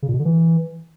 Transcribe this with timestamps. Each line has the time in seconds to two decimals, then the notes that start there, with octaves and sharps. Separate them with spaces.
0.03 C#3
0.08 A#2
0.14 B2
0.19 D3
0.25 E3